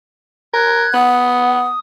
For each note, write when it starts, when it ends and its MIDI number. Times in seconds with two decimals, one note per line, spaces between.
0.54 0.87 70
0.54 0.93 90
0.54 0.93 92
0.94 1.72 59
0.94 1.62 78
0.94 1.79 87